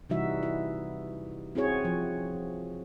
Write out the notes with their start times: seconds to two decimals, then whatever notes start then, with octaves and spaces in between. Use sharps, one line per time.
0.09 C3 E3 G3 D#4 F#4 E5
0.43 E4
1.55 C4 E4 F#4 G#4 C#5
1.85 F3